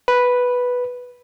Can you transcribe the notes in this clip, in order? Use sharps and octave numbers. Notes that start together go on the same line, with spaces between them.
B4